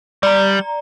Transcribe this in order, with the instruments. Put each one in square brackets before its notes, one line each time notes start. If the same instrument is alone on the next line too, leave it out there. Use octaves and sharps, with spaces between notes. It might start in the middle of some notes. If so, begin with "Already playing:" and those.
[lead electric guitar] G3 [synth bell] D5 A#5